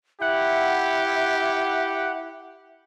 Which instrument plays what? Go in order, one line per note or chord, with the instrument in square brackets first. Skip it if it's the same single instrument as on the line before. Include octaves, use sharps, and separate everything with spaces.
[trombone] E4 [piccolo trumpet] G4 [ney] E5 [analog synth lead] F#5